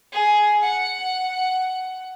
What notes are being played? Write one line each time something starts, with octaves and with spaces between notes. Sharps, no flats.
G#4
F#5